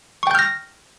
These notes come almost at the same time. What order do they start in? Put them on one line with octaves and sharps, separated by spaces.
C#6 G5 G6 F6 A#6